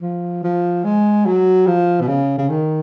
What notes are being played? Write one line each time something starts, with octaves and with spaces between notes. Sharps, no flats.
F3
F3
G#3
F#3
F3
B2
C#3
C#3
D#3